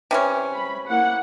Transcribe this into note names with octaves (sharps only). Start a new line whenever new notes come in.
C3 E3 C#4
B5
A#3 E4 F#5